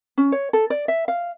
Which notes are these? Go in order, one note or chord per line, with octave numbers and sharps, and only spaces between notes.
C#4
C#5
A4
D5
E5
F5